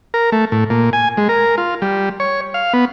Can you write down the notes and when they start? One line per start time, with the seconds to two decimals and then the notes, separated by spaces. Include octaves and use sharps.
0.14 A#4
0.32 A3
0.52 A2
0.70 A#2
0.93 G#5
1.17 G#3
1.29 A#4
1.58 F4
1.82 G3
2.20 C#5
2.54 F5
2.73 B3